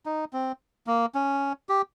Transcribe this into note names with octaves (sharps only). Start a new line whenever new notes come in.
D#4
C4
A#3
C#4
G4